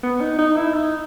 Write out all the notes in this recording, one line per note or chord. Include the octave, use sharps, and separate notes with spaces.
B3
D#4
D#4
E4
D#4